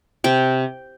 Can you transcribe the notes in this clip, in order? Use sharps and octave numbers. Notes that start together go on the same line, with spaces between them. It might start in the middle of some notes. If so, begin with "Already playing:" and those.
C3 G5